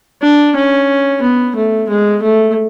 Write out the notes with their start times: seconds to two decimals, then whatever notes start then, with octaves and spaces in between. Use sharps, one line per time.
0.22 D4
0.56 C#4
1.22 B3
1.56 A3
1.89 G#3
2.22 A3